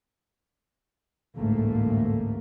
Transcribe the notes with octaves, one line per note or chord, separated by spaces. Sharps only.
A1 D2 G#2 A3 A#3